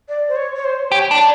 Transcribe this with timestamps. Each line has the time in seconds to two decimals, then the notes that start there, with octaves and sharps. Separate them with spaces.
0.09 D5
0.29 C5
0.36 C#5
0.56 C#5
0.64 C5
0.91 G4 C#5
1.11 D4
1.19 D5